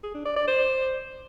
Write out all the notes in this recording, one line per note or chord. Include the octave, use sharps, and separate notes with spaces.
G#4
D4
D5
D5
C5